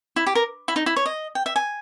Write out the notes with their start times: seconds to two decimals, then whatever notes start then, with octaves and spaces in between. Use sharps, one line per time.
0.16 E4
0.27 G4
0.35 A#4
0.68 E4
0.76 D#4
0.86 E4
0.96 C#5
1.06 D#5
1.35 G5
1.46 E5
1.56 G#5